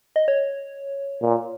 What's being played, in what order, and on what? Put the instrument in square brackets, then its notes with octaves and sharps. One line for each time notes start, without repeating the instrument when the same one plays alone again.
[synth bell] D#5
C#5
[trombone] A#2